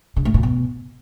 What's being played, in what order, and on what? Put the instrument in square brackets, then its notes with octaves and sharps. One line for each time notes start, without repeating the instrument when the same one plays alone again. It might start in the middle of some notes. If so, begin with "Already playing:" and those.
[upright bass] C#3
A2
A#2
B2